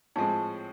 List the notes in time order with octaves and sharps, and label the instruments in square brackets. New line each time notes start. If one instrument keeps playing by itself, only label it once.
[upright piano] A2 F3 G#3 C4 [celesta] A5